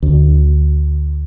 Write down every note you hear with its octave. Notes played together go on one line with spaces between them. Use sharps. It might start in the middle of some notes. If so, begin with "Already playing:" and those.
D2